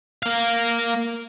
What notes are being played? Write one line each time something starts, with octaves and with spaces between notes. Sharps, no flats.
A#3 F5